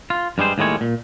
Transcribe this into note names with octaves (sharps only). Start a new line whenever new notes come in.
F4
G2 G3 G#3 C5
D#2 A2 G3 G#3 C#5
A#2